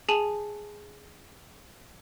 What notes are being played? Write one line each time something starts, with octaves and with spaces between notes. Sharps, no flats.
G#4 G#5 A5 D#7 F7 F#7